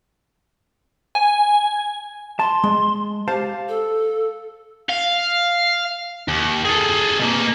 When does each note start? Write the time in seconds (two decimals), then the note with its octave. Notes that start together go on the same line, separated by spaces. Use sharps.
1.15 G#5
2.39 A5 C6
2.64 G#3
3.28 G4 C5 F5 A5
3.68 A4
4.89 F5
6.28 D#2
6.65 G#4 A4
7.20 B2 A#3